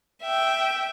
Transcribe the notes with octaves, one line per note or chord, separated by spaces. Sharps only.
E5 G5